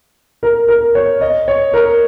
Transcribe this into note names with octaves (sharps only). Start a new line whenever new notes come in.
A#4
A#4
C#5
D#5
C#5
A#4